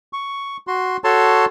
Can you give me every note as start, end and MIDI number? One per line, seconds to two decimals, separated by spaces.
0.13 0.57 85
0.67 0.97 66
0.67 0.97 84
1.04 1.46 66
1.04 1.46 69
1.04 1.46 73
1.04 1.46 81
1.04 1.46 84